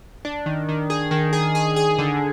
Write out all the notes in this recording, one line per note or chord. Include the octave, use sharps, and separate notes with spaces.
D4
D#3
D#3
G#4
D#3
G#4
G#4
G#4
D3